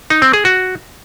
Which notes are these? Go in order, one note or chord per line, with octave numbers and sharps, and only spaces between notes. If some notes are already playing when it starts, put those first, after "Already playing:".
D#4
C4
G#4
F#4